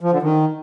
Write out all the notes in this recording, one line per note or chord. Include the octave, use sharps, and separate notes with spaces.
F3
D3
D#3